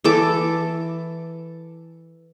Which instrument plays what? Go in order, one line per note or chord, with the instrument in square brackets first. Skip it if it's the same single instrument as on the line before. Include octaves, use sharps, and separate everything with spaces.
[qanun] E3 A4 D6